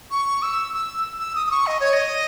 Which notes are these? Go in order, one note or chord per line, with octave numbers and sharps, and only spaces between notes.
C#6
E6
E6
E6
D#6
D#6
C#6
D#5
C#5
D#5